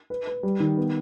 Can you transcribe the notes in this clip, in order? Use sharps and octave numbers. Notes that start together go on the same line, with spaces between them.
B4
B4
G3
D#3
B3